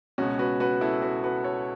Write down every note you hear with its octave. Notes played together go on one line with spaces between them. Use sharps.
C#2 B2 C#4 F#4
F#4 B4
F#4 B4
E4 A4
F#4 B4
F#4 B4
A4 C#5